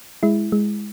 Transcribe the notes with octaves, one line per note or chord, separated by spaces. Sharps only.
G#3 E4
G#3